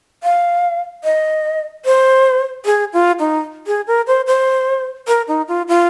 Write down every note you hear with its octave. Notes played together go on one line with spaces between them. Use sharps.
F5
D#5
C5
G#4
F4
D#4
G#4
A#4
C5
C5
A#4
D#4
F4
F4